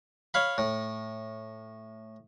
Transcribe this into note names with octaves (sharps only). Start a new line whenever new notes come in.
C#5 F5 B5
A2